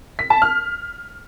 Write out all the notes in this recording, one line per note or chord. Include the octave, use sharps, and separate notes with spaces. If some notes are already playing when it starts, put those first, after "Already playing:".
B6
A5
F6